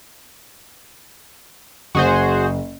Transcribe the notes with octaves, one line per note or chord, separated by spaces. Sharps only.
F#1 F#4 G#4 C5